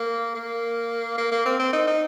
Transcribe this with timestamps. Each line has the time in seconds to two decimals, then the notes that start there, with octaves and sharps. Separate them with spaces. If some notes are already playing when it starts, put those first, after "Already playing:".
Already playing: A#3
0.35 A#3
1.18 A#3
1.32 A#3
1.45 C4
1.60 C4
1.73 D#4
1.87 D#4